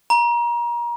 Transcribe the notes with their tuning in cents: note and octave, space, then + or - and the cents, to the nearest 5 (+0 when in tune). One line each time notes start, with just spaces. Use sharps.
A#5 +30